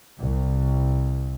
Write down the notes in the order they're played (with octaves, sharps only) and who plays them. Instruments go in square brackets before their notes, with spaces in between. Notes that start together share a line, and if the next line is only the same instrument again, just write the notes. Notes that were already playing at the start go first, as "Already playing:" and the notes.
[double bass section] C2